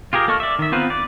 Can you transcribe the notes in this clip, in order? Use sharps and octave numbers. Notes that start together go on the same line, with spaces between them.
F4 G4 G#4 A#4
A#3 A4 D#5 C#6 F6
D5 E5
D#3 E5
B3 C4 F4 A#4 B4
D5